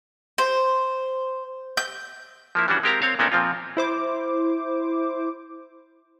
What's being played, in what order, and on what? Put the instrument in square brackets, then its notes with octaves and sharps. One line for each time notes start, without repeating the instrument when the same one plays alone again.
[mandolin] C5
G6
[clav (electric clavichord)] F3 A#3 E4
E3 G3 C#4 D4 F#4
G#3 C4 G4 A#4 F5 A#5
C4 C#5 F5
A#2 B3 C#4 D#4 A4 A#4
A#2 F3 C4 F4
[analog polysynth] E4 C5 D6